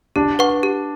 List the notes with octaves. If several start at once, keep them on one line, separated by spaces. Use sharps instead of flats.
D4 G4
B4 F#5 C#6
G4